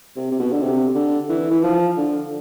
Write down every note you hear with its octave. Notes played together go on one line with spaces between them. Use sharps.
C3
C3
B2
D3
C3
D3
E3
E3
F3
D3